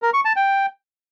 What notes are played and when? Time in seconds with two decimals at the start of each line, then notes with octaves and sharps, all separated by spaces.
0.02 A#4
0.14 C#6
0.25 A5
0.36 G5